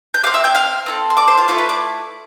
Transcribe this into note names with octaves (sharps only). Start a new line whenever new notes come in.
G6
C4 G4 F5 F6
E5 E6
G5 G6
F5 F6
C4 E4 A4
C6
D5 D6
C5 C6
F4 F5
A3 E4 F4 A4 F5
B4 B5
D5 D6